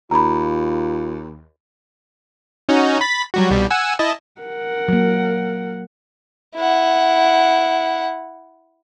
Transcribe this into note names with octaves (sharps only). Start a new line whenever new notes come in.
D#2 F4 A#5 B5
C#4 D#4 F#4
B5 A6 B6
F#3 G3 F#4
C2 B2 G3
F#5 G#5 E6
E4 D#5 A5
A#4 F#5
F#3 A#3
E4 F#5